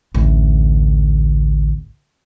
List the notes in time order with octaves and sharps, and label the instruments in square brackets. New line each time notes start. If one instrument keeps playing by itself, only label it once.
[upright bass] A1 D2